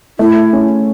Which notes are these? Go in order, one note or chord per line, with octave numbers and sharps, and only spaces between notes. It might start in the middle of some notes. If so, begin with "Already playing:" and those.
A3 E4
C#4